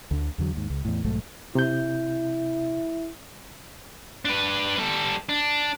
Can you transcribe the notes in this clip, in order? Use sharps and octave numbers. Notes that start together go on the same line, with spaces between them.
D2 D3
E2 D3 F#3
D#2 G#2
C#2
E2 A2
B1 G#2 F#3 A3
C3 E4 G6
D4 B4
G3 A4
D4